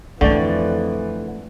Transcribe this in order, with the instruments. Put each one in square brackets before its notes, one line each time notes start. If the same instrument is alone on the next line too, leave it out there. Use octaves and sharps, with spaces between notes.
[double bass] F2 E3 [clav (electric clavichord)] D3 [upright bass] A3 [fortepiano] D5 G5 C#6